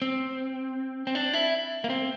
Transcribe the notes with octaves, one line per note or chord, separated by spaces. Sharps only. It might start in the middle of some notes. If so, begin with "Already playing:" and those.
C4
C4
D4
E4
A#3
C4